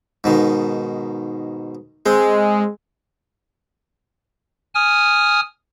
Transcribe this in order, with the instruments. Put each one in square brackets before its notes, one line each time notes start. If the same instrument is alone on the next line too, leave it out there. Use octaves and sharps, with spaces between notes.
[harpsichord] G#2 B2 D#3
[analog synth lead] G#3 [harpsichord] C4
[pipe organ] G#5 D#6 F6